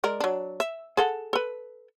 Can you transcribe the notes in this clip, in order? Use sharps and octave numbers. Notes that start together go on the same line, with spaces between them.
G#3 A#4 D5
F#3 D4
E5
G#4 A4 F#5
A4 B4